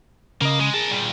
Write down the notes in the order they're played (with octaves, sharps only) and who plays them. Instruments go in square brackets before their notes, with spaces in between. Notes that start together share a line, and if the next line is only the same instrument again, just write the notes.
[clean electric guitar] C#3 D#5 [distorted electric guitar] A#3
[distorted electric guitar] G#3
[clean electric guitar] G#4 [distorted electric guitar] A#4 A5
[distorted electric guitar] A#2 G3